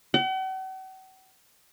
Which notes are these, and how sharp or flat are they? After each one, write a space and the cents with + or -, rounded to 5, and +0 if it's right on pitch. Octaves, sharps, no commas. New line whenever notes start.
F#5 +45